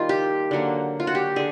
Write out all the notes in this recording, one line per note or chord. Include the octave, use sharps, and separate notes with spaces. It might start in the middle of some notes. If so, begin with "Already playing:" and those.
Already playing: D#3 G3 A#3 F4
G4
D3 F#3 A#3
F4
F#4
G4
D3 G#4